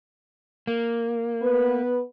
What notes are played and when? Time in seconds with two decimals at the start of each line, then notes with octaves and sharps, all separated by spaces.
0.67 A#3
1.42 B3 B4